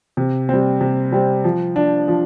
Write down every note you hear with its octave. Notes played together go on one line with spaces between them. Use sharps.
C3
G3 C4
C3
G3 C4
F3
D4
F3